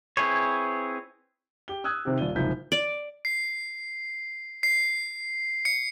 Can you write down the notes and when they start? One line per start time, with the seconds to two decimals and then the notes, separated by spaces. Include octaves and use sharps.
0.17 C4 E4 G#4 B4 C#5
1.68 G4 G7
1.84 D#6 E6 F#6 G#6
2.05 C3 D#3 C4 G4
2.18 D#1 F4 D5 D#7 G7
2.35 F#1 G#2 C3 F3 G6 B6
2.72 D5
3.25 C7
4.63 C7
5.65 C#7